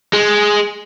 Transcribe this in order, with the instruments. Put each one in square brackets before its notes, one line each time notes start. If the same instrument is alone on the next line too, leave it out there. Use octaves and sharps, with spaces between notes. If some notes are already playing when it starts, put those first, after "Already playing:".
[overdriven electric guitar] G#3